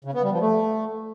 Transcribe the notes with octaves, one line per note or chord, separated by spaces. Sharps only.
C#3
B3
G3
F3
A3